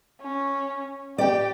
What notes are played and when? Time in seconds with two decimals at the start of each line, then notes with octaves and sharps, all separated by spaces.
0.22 C#4
1.18 G4 D5 G5